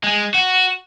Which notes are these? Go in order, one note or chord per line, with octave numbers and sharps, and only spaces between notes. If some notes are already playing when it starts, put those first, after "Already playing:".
G#3
F#4